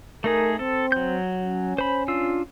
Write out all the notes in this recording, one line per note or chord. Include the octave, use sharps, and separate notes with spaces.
A3 D#4 G#4 A#4
C4 A4
F#3 G6
C#4
C5 B5
D4 F4 E6